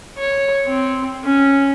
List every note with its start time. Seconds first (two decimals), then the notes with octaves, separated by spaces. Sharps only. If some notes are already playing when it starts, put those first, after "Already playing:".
0.18 C#5
0.66 C4
1.24 C#4